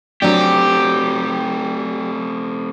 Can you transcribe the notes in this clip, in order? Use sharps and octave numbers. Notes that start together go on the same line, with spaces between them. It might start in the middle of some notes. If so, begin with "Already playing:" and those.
F#3 A3 C4 D4 G4